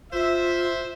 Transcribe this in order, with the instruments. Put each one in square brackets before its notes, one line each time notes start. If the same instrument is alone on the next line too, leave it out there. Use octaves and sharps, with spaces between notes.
[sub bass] G1 [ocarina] F4 [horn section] C5 E5